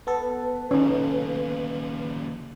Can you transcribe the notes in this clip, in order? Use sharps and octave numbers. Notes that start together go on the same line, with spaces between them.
B3 A4 B4
D#2 C#3 C#4 D#4